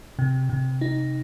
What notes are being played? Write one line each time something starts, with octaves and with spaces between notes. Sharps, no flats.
C3
C3
D#4